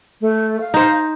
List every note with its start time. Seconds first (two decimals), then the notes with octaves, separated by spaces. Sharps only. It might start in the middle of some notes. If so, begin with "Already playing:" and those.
0.21 A3
0.60 F5
0.74 D#4 C5